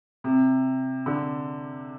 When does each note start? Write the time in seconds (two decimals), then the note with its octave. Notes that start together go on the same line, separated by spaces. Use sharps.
0.24 C3
1.06 D3